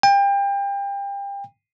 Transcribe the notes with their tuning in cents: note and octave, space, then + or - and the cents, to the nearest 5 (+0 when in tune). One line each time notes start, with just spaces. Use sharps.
G5 +30